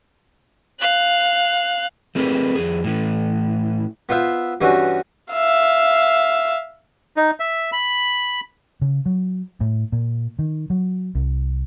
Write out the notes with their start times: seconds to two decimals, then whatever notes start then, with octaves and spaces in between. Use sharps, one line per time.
0.80 F5 F#6
2.15 A3 C4 G#4 A#4 B4
2.55 F2 G#4
2.84 A2 E3
4.09 B3 F4 C5 E5
4.61 G2 E3 C#4 F#4
5.32 E5 F5
7.17 D#4
7.40 E5
7.72 B5
8.81 C#3
9.06 F#3
9.61 A2
9.92 A#2
10.39 D#3
10.70 F#3
11.15 C2